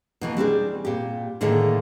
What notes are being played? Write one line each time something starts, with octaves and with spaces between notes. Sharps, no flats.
B2 E3 A#3
G3 C4 D4 G#4
A#2 G4
A2 D3 D#3 A3 A#3 G#4